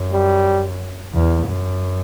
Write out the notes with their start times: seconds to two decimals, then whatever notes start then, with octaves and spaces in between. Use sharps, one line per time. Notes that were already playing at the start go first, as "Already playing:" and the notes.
Already playing: F#2
0.13 G3
1.14 E2
1.48 F#2